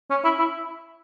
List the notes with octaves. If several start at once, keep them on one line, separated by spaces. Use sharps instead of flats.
C#4
E4
E4